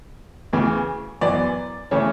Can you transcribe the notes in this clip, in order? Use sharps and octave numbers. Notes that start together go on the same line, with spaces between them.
D2 C#3 E3
F#2 E3 B3 D5
C#3 E3 A3 C#4 C#5